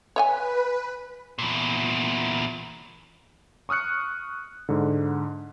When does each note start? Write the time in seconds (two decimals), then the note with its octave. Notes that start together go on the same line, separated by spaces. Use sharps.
0.16 B4 C#5 D#5 G#5
1.39 E2 A#2
3.69 C#6 D#6 F6 F#6 C#7
4.69 G#2 D3